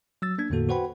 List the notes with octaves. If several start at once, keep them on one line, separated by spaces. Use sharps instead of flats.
F#3 E6 A6
A#3 D4 G#6
E2 A2 D3 A#3 F#4 A4
F#4 B4 C5 F#5 G5 B5